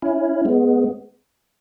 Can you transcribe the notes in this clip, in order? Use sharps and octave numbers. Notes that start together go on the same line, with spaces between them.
C#4 E4
G#3 B3